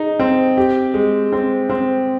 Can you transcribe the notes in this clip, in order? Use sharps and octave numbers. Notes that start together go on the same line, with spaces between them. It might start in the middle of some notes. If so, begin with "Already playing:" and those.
Already playing: D#4 G#4
C4
G4
G#3
C4
C4